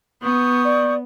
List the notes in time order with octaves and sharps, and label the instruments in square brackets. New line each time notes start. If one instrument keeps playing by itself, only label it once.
[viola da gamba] B3 [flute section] C#6 D#6 G6
[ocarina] D5